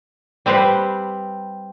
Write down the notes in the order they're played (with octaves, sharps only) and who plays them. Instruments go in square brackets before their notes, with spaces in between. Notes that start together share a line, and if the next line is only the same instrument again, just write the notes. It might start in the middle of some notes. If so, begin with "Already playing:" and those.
[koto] G3 C4 G4 B4 C5